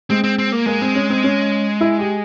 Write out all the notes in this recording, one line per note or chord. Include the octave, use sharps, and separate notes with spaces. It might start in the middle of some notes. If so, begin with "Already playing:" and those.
G#3 C4
C4
C4
A#3
G#3 A#3
C4
C#4
C4
C#4
E4
G4